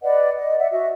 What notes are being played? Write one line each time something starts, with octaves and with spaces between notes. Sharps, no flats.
B4 D5 D#5 F#5
D#5
D5 E5 F#5
F#4 D#5 E5